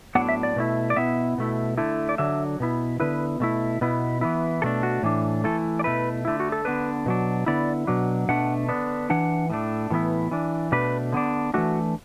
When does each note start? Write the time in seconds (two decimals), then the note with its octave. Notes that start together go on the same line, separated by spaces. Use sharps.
0.15 A2 F#3 B3 D4 F#5
0.29 E5
0.43 D5
0.56 B2 A3 E4
0.90 D5
0.96 B2 B3 E4 E5
1.38 B2 A3 E4
1.78 D3 A3 E4
2.09 D5
2.18 D3 F#3 D4 E5
2.60 B2 B3 E4
3.00 D3 B3 E4 B4
3.40 B2 A3 E4
3.81 B2 B3 E4
4.21 E3 B3 E4
4.62 B2 A3 D4 A4
4.83 F#4
5.03 A2 E3 D4
5.44 E3 A3 E4 A4
5.79 D5
5.84 B2 A3 E4 B4
6.25 D3 A3 E4
6.40 F#4
6.52 A4
6.65 D3 B3 D4 B4
7.06 B2 F#3 D4
7.46 D3 B3 E4 D5
7.87 B2 F#3 D4
8.29 B2 A3 D4 F#5
8.69 D3 B3 D4
9.10 E3 D4 F#5
9.50 A2 A3 D4
9.90 A2 E3 B3 E4
10.31 E3 D4
10.72 B2 A3 D4 B4
11.13 D3 B3 D4
11.54 E3 A3 D4 F#4